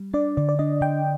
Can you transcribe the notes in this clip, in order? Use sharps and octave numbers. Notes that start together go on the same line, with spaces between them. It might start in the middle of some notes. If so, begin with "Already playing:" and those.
Already playing: G3
D4 D5
D3 D5
D5
D4 D#5
D3 G5